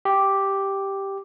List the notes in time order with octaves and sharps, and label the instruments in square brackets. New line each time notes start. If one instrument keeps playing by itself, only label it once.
[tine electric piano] G4